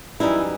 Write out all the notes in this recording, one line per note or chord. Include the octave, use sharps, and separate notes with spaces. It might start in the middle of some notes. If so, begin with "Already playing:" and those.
F#2 E3 G3 D#4 E4